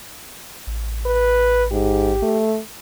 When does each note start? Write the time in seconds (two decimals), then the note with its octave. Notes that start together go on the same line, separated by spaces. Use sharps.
0.67 A1
1.06 B4
1.72 G#2 G4
2.23 A3